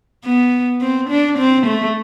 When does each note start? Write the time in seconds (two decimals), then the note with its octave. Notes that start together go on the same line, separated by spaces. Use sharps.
0.24 B3
0.81 C4
1.10 D4
1.38 C4
1.66 A3